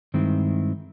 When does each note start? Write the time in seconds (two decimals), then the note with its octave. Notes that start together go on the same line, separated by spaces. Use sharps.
0.14 G2 D#3 G#3 C4 E4